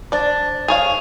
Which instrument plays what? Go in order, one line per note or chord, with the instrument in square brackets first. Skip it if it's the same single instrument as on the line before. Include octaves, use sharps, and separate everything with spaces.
[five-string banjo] D4 D5 [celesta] C5 A6
[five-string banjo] G#4 C#5 F5 [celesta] F7